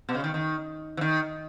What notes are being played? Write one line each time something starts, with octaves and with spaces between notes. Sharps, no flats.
B2
C#3
D#3
D#3
E3
D#3